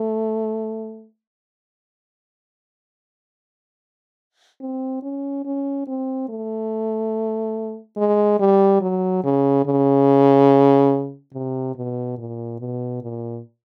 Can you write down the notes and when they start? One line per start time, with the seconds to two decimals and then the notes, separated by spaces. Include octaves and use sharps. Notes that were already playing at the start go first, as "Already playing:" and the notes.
Already playing: A3
4.61 C4
5.03 C#4
5.45 C#4
5.87 C4
6.29 A3
7.97 G#3
8.39 G3
8.81 F#3
9.24 C#3
9.66 C#3
11.34 C3
11.76 B2
12.18 A#2
12.60 B2
13.02 A#2